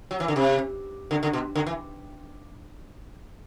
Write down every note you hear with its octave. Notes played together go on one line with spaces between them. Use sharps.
F#3
E3
D3
C3
D3
D3
B2
D3
E3